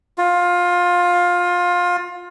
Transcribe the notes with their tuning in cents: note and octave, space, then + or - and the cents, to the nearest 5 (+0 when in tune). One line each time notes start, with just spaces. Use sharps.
F4 +20